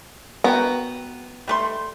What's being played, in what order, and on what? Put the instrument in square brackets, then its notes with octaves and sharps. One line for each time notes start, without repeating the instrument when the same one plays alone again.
[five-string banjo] B3 [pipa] F#4 A#4 G5
[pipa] G3 A3 C6